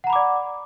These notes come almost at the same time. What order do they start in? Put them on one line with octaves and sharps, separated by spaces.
F#5 A#5 B5 D6 D5